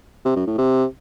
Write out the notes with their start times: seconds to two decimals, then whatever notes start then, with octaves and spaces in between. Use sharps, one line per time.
0.25 C3
0.36 F#2
0.47 A2
0.58 C3